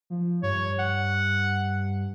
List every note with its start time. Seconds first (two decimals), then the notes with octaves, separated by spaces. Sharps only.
0.10 F3
0.43 G2 C#5
0.79 F#5